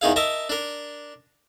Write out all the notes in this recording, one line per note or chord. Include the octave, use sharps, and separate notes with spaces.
E2 D#3 D#4 G#4 F5
A#4 D#5 E5 A5
D4 A#4